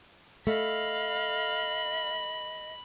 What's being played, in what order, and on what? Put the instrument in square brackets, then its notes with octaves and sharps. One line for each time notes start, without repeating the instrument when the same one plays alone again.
[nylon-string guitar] A3 [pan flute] D#5 [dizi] F5 [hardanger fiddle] B5